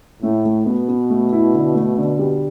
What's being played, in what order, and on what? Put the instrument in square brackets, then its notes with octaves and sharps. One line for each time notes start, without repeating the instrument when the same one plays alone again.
[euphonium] A2 [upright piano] A3
[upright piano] A3
[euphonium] B2 [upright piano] B3
[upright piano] B3
A3
E4
D3
A3
D3
G3